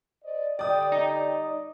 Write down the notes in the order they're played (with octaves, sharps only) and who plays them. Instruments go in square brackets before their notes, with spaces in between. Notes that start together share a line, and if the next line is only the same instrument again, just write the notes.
[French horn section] C5 D5 D#5
[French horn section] D3 G3 [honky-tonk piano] D5 D#6 [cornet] G5
[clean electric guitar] D#4 [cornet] G5
[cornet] D#5